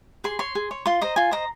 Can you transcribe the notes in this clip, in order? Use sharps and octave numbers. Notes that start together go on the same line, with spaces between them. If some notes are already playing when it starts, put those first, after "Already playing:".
G#4 C6
C#5 C6
G#4
C#5
F4 C6
C5 D#5 A#5
F4 G#5
C5 D#5 A#5